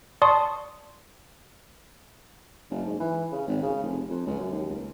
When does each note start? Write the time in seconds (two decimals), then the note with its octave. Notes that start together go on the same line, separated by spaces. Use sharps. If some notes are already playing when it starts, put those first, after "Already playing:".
0.22 D5 A5 C6 C#6 D#6
2.71 F#1
2.86 G#2
3.00 E3
3.32 C#3
3.48 G#1
3.63 C#3
3.83 F1
4.10 F2
4.27 C#2
4.40 F#2
4.52 D#2
4.69 C#2